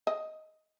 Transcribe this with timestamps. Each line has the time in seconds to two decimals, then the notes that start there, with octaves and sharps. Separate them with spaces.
0.07 D#5